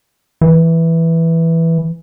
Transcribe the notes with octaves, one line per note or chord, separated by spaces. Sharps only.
E3